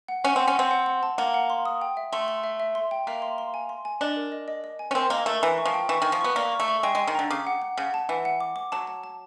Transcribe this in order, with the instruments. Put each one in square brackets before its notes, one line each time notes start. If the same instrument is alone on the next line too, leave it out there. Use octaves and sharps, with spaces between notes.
[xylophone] F#5
[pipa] C#4 [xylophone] F#5
[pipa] C4
[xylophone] F#5
[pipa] C#4
[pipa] C4 [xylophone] F#5
[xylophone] F#5
F#5
A5
[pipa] A#3 [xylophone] F#5
[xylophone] F#5
C6
D#6
G5
E5
[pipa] A3 [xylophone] C6
[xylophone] C6
E5
E5
C6
G5
[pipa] A#3 [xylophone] E5
[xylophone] C6
C6
G#5
C6
G#5
[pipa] D4 [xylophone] D#5
[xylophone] A#4
D#5
D#5
D#5
G#5
[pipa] C#4
[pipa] C4 [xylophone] A#4
[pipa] A#3 [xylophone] D#5
[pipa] A3 [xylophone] A#4
[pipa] E3 [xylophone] A#5
[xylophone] C#6
[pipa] F3
[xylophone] G5
[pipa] E3 [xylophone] C#6
[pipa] D#3
[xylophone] C#6
[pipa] F3
[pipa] B3 [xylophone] C#6
[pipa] A#3 [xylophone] D5
[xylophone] C#6
[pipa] A3
[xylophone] C#6
[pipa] G#3 [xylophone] G5
[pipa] G#3
[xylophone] G5
[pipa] D#3
[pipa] D3 [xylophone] A#5
[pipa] C#3 [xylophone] D6
[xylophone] F#5
F#5
[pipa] C#3 [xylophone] F#5
[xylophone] A5
[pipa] E3 [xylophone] F#5
[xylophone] F#5
D6
D6
[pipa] F#3 [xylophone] A5
[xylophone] A5
A5